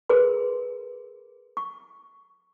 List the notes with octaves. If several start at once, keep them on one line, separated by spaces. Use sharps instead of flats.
G#4 A#4 B4 C6
C#6